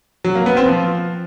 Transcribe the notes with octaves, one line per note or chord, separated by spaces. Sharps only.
F#3
A#3
B3
C4
F3